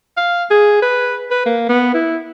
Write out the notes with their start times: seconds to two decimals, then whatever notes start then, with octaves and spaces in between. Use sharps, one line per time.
0.17 F5
0.51 G#4
0.82 B4
1.31 B4
1.46 A#3
1.69 B3
1.94 E4